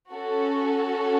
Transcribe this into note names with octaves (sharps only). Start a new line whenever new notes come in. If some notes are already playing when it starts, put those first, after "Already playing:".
C#4 F#4 A4